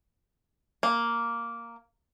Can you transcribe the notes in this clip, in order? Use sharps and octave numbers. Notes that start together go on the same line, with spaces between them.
A#3